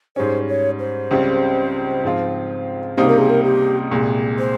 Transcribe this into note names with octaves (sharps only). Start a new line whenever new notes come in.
G#2 G3 C#4 C5
C#5
C5
C#2 C#3 G3 C4
G#2 F3 C4 F4
C#2 C3 G3 A#3 D#4 C5
A#4
G#4
A#4
G4
C2 A#2 G#3
C5